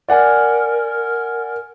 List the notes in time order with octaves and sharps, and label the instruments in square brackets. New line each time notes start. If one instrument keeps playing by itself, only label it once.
[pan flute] A#4 [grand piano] D5 F#5 G#5